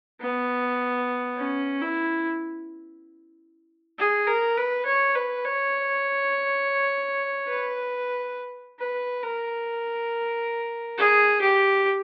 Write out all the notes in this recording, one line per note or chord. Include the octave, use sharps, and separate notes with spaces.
B3
C#4
E4
G#4
A#4
B4
C#5
B4
C#5
B4
B4
A#4
G#4
G4